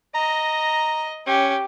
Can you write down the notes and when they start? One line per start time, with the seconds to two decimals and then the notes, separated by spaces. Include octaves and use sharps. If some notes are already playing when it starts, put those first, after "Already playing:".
0.15 D#5 A#5
1.27 C#4 G4